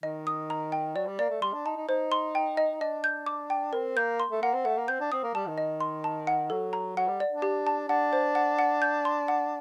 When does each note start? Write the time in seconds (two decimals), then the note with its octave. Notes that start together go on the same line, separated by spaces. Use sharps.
0.03 D#3 D#5
0.27 D#6
0.50 A#5
0.72 G5
0.95 F#3 D5
1.07 G3
1.19 A#3 D5
1.30 A3
1.42 G3 C6
1.53 D4
1.66 D#4 A5
1.76 D#4
1.88 D#4 C5
2.12 C6
2.35 G5
2.57 D#5
2.80 D4 D#5
3.04 G6
3.26 D6
3.50 G5
3.73 C4 A#4
3.97 A#3 G6
4.20 C6
4.31 A3
4.42 A#3 F#5
4.54 C4
4.65 A3 F#5
4.78 A#3
4.88 C4 G6
5.00 D4
5.12 C4 D#6
5.23 A#3
5.35 G3 A5
5.47 D#3
5.58 D#5
5.80 C6
6.04 A5
6.27 F#5
6.50 F#3 A4
6.73 A#5
6.97 F#3 F#5
7.08 G3
7.20 D5
7.32 D4
7.42 G4
7.67 A5
7.89 D4 F#5
8.13 C5
8.35 F#5
8.59 F#5
8.82 G6
9.05 C6
9.28 F#5